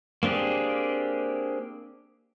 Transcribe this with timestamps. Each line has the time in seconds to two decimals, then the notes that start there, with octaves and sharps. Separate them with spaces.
0.23 A#3 C4 D4 G4 G#4